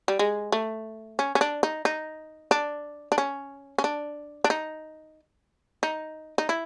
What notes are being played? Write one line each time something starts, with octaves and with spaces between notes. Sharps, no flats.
G3
G#3
A3
C#4
C#4
D4
D#4
D#4
D4
D4
C#4
C#4
D4
D4
D#4
D#4
D#4
E4